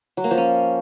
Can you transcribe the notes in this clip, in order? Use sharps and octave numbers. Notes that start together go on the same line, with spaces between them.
F#3
A#3
F3
C#4